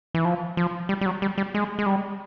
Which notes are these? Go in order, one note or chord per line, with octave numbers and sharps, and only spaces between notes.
E3
F3
F3
G3
G3
F#3
G3
G3
G#3
G#3
G3